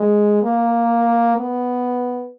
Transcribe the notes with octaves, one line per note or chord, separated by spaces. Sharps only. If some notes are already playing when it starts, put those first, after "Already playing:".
Already playing: G#3
A#3
B3